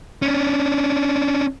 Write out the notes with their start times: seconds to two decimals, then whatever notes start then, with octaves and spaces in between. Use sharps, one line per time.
0.22 C#4 D4